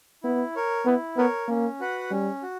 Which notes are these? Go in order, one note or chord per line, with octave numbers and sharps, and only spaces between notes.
B3 E4
A#4 C#5
B3 E4
B3 A#4 C#5
A#3 C#4
F#4 B4 F#5
G3 C#4
F#4